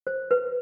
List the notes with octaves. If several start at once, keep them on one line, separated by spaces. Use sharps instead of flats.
C5
B4